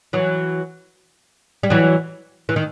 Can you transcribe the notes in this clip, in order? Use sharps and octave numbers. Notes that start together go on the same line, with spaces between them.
E3 F#3
G3
E3 F#3
E3
D#3